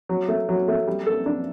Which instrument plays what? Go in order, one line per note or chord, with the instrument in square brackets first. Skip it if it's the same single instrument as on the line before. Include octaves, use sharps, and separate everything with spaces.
[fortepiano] F#3
A3
F#3
A3
G3
A4
D4